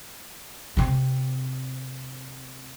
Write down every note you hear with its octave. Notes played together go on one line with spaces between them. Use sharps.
C3 C4